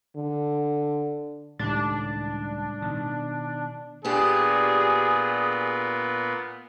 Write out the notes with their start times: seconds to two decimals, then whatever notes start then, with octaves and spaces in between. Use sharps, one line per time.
0.17 D3
1.59 C#2 A2 D#3 G3 D4
2.82 B2 D#3
4.05 A#2 B3 D4 G4 G#4